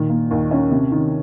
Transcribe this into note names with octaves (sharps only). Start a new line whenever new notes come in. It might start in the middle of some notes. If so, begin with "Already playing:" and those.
Already playing: A#2 D#3
A#3
D#2
C#4
C3
D#3